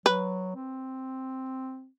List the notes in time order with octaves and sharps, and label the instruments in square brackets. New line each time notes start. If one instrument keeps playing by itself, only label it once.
[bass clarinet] F#3 [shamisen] B4
[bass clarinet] C4